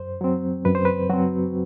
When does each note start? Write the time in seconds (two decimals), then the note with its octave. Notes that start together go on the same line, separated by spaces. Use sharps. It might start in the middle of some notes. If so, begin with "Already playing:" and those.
Already playing: F#2 C5
0.21 F#3 C4
0.65 F#2 B4
0.75 C5
0.85 B4
1.10 F#3 C4 F#4